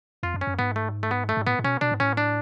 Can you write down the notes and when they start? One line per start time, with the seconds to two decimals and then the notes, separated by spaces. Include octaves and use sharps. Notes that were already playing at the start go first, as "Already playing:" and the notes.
0.23 F2 F4
0.34 F#2
0.41 C#4
0.47 F#2
0.59 G#2 B3
0.76 A3
1.03 A3
1.11 B3
1.29 A3
1.37 G#2
1.47 A2 B3
1.59 A2
1.64 B2 C#4
1.81 B2 D4
1.92 G#2
2.00 A2 C#4
2.17 D4